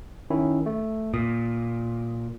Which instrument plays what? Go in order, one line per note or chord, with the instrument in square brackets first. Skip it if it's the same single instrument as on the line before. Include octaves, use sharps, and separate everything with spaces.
[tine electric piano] D#3 C#4 E4
A3
[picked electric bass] A#2 [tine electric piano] D#6